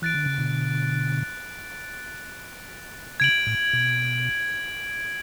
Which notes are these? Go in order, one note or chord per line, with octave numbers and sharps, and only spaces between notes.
E3 F#6 A6 D7
D3
C#3
B2 D3
C#3 G#6 D7 F#7
A2
B2